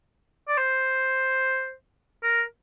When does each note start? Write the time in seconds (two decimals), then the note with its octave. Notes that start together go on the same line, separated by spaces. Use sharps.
0.49 D5
0.58 C5
2.23 A#4